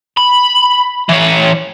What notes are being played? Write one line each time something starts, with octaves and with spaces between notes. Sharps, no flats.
B5
E3 C#5